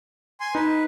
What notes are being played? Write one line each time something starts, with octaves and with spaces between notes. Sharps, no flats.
G#5 C6
D#4 B4